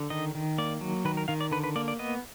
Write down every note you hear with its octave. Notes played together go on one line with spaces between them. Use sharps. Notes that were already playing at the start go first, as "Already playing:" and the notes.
Already playing: D3
D#3 D#5
D#3
A#3 D5
F#3
D#3 B4
A#4
D#3 F5
D5
D3 B4
B4
A#3 D5
D5
B3 D#5